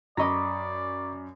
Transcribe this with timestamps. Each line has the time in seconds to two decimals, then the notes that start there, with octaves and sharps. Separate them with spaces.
0.17 F#2 D5 D#5 A#5 B5 C#6 D6 A#6